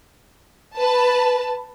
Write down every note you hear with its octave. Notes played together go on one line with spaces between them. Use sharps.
B4 A5